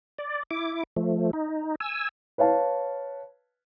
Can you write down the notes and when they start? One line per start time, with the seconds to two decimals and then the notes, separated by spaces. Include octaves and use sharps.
0.19 D5
0.51 E4 D6
0.96 F3 A3
1.33 D#4
1.80 G#5 E6
2.38 B4 C#5 F5 A5